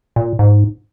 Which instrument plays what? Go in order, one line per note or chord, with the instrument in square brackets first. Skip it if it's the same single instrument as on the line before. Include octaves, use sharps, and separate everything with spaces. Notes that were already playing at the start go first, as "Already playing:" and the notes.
[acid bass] A#2
G#2